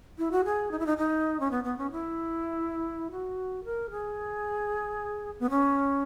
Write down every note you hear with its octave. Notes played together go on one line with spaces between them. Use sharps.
E4
F#4
G#4
D#4
E4
D#4
D#4
C#4
B3
B3
C#4
E4
F#4
A#4
G#4
B3
C#4